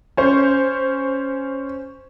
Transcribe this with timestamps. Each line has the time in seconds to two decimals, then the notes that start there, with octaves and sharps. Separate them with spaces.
0.17 C#4 C5